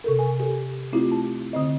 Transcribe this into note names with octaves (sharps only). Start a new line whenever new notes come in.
C3 A4 A#4
G#5
G4 A4
A3 C4 E4 F4 G4
A5
D3 C4 D#5